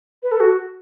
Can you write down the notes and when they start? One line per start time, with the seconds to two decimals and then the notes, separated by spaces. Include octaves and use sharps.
0.23 B4
0.32 A4
0.40 F#4